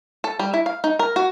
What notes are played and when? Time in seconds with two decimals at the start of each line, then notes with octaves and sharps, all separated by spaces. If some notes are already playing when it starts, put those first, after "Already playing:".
0.24 A4
0.39 G3
0.54 E4
0.66 F5
0.84 D#4
0.99 A#4
1.16 F#4